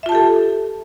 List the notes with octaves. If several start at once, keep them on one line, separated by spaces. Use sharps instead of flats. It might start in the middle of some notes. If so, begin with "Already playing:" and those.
F4 G4 A4 E5 A5